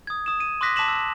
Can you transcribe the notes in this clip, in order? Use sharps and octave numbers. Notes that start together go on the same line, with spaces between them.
D#6 G#6
D#6 E7
D#7
C6 D6 D#6 F#6 A#6 B6
A5 D6 B6 E7 F#7
E6